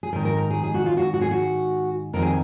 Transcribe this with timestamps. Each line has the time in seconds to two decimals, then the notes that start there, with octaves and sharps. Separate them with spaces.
0.03 G#4
0.13 G#2 D#3 A#4
0.25 A#4
0.37 A#4
0.50 G#4
0.63 G#4
0.74 F#4
0.86 F4
0.97 F#4
1.14 F#4
1.21 G#4
1.31 F#4
2.13 F2 D#3 A#4
2.22 G#4